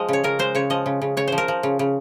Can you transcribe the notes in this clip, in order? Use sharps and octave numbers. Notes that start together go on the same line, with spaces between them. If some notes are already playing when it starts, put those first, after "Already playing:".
Already playing: F3 G#3 D#5
C#3 C#5
C#3 A#4
G#3 C5
C#3 C#5
F3 D#5
C#3
C#3
C#3 C#5
F3 C5
A#4
F3
C#3
C#3